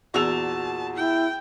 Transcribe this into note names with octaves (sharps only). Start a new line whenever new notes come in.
E2 A#2 F#4 A5 E6 F7
E4 G5